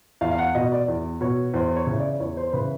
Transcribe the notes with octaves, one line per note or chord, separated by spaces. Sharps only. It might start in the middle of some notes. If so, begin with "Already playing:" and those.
E2 F5
F5
F#5
B2 D#5
D5
E2
B2 C#5
E2 C5
C#5
C#3 E3
D5
E2 C#5
C5
C#3 E3 B4